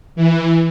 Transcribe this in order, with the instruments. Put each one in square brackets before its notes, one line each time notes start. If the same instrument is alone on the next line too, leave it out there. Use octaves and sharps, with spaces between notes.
[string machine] E3